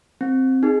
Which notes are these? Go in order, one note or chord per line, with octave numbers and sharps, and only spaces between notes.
C4
D#4 G#4